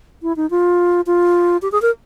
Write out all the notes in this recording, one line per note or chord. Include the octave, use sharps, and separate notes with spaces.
E4
D#4
F4
F4
G4
G#4
A#4